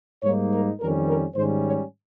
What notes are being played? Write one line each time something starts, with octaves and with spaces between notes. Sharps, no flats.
G#2 G3 A#3 D#4 C#5
A#4
F2 D#3 G3 C#4 A#4
A#4
G#2 D#3 G3 C#4 C5
C#5